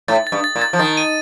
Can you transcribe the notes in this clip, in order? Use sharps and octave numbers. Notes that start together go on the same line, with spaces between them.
A2 A6
A6
G2
A6
A#2
A6
F3
D#3 A6
D#7